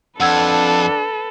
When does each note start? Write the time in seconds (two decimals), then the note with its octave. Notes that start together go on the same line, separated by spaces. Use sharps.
0.20 F2 D4 A4 B4 F#5 E6 G#6